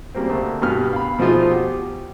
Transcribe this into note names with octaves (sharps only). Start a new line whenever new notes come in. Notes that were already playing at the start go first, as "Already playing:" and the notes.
C#3 G3 A#3 C4
D2 A3 A#3
G2 B2 G3 B3 F6
F5 B5
B2 F3 A3 D#4 F4 G#4
F#4 G4